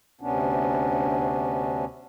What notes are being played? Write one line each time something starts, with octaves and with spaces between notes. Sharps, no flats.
D2 C3 B3 C#4 D4